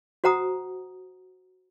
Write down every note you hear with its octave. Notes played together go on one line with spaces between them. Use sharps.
F#4 C5 F#5 A#5 D#6